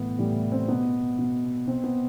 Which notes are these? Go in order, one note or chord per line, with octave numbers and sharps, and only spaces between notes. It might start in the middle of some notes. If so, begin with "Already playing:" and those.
Already playing: A2 E3 B3
A2 E3 G3
C4
B2 B3
B2
B2 C4
B3